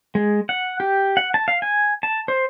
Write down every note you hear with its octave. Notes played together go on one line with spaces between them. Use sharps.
G#3
F#5
G4
F#5
A5
F5
G#5
A5
C5